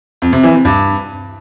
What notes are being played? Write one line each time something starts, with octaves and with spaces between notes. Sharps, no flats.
F2
C3
E3
C3
G2